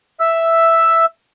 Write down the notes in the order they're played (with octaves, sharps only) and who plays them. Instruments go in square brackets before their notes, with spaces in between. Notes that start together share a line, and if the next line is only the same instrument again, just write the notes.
[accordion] E5 E6